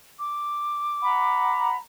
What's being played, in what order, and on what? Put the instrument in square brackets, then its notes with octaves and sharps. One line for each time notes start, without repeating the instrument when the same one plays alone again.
[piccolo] D6
[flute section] F#5 A#5 B5